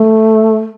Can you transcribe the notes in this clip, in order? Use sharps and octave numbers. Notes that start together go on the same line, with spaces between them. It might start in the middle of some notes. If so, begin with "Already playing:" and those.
Already playing: A3